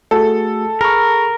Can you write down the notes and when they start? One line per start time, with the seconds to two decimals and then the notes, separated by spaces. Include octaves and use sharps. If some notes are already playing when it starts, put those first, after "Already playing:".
0.11 A3 F#4 G#4 A4
0.81 G#4 A#4 B5 C#6